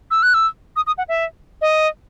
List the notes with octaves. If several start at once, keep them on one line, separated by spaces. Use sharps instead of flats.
E6
F#6
E6
D#6
D#6
F#5
E5
D#5